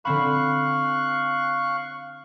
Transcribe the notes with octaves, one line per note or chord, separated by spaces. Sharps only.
D3 C4 F5 B5 C#6 F#6